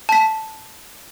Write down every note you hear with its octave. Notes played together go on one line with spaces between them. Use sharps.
A5 B6